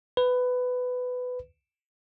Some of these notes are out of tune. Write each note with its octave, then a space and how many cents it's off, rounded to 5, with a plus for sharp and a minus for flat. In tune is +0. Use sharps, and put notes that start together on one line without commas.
B4 +15